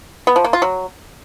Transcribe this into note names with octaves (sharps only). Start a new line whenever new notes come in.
B3
F3
A#3
F4
F#3